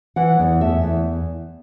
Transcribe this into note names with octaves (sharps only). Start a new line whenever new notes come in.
E3 F#5
E2
A3 E5
E2